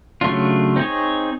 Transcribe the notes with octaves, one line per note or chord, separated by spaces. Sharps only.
C#3 F#3 A3 D4 F4
C4 D#4 G#4 C#5